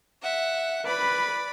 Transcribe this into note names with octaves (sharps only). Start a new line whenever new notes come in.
E5 F#5
B4 D5 B5